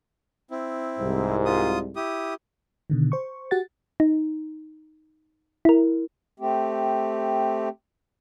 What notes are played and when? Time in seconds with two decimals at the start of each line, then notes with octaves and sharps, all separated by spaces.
0.51 C4 E4
0.99 C2 G#2
1.46 F4 D#6
1.96 E4 G4 D#6
2.90 B2 D3 D#3
3.12 C5 C#6
3.51 F#4 G4 F#5 A6
4.00 D#4
5.65 E4 A#4
6.40 A3 C4 G4